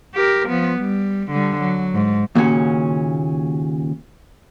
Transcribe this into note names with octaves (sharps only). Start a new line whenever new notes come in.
G4 A#4
F3 B3
G3
D3 G3
F#3
G#2
D#2 A#2 C#3 C#4 F#4